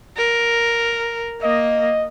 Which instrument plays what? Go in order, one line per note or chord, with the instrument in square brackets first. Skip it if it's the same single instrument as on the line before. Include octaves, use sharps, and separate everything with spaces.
[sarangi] A#4
[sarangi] A#3 [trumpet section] D#5